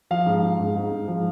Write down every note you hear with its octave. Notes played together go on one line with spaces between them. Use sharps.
F3 F5
G#2
G#2
G#2
G#2
G#2
F3